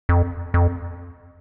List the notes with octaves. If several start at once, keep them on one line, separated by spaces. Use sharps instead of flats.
F2
F2